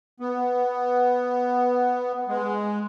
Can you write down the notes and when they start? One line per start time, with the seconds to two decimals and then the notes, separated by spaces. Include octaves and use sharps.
0.20 B3
2.29 G#3